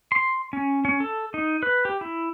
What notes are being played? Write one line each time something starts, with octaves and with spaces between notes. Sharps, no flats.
C6
C#4
C#4
A4
D#4
B4
G4
E4